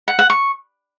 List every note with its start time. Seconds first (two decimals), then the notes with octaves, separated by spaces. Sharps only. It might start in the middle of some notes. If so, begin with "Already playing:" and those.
0.08 F#5
0.19 F#5
0.30 C#6